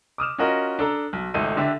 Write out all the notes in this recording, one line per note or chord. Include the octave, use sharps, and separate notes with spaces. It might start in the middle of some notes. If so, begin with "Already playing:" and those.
D6 D#6 F6 E7
C#4 F4 F#4 A#4 D#5
D4 A4 A#5
B1
G#1 C#2 A3 D#4 A4 D#7
D3 D4 G4 E5